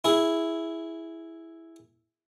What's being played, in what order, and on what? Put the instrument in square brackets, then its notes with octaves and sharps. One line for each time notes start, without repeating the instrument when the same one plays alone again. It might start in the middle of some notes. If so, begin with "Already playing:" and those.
[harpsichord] E4 G#4